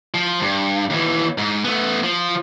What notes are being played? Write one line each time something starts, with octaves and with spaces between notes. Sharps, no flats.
F3
G2
D#2 E3
G#2
A3 B3
F3